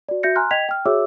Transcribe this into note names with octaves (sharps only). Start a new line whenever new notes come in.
F#4 D5
F#4 E5 G6 A#6 C#7
G#5 A#5 C6 F6 F#6
D#5 G5 G#6 B6 F7
G5 F6
F#4 G#4 C#5 E5 D6 E6